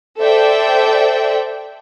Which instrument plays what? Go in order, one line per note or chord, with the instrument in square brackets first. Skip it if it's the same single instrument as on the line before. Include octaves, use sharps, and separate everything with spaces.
[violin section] A4 C5 D5 E5 G5